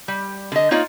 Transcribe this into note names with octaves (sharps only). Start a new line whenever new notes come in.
G3
D3 D#5
A#3 D#4 F4 C#5 D5